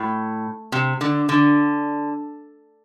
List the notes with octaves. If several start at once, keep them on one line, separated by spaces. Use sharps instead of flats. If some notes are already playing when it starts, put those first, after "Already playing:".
Already playing: A2
C3
D3
D3